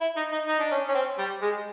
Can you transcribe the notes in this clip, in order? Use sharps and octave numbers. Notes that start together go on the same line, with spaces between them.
E4
D#4
D#4
D#4
D4
C#4
C#4
C4
G3
G#3